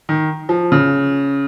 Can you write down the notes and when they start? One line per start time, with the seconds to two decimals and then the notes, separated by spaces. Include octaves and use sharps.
0.09 D#3
0.49 F3
0.72 C#3